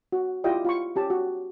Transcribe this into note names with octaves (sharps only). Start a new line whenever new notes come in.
F#4
E4 F4 G4 D5 D#5 G5
F4 B5 C#6
C#4 G4 A5
F#4